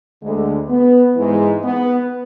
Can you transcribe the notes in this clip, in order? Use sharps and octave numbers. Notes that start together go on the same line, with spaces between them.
D2 D3 G#3
B3
G#2 E3 G#3
B3